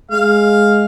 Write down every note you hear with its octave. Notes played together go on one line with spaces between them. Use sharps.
G#3 F5